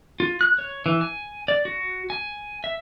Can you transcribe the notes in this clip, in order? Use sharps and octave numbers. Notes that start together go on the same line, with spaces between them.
F4
F#6
C#5
E3
G#5
D5
F#4
G#5
E5